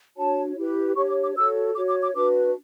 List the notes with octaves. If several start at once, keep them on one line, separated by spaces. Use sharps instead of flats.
D4 F#4 C#5 A5
E4 G4 B4
D4 G4 C#5 C#6
D6
D6
F#4 A4 C#5 E6
F#4 C#5 D6
D6
D6
D4 F#4 B4 D6